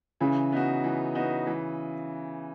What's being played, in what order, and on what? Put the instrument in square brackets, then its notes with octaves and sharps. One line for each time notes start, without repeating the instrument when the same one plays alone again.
[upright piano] C#3 [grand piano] E3
[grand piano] B3 D#4 F#4
E3
B3 D#4 F#4
E3